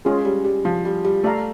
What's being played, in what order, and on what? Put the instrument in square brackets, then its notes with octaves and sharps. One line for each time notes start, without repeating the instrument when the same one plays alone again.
[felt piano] G#3 [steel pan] C#4 F4 G#4
[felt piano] G3
G3
F3
G3
G3
[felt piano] A3 [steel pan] A4 D5 F5 A#5